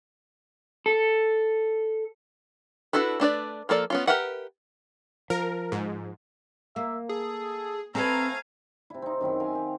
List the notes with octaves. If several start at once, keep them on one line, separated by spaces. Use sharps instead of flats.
A4
D4 E4 F#4 A4 B4
A3 D4 B4 D5
F3 A#3 A4 D5
B3 C#4 F4
G4 A#4 B4 E5 F#5
F3 A#4
G#2
A#3 E5
G#4 A4
A3 C4 A4 B4 F5 G#5 A#5
C3 E4
C4 D#4
F#2 D#3 C4 E4
A#4 F5 G#5
G4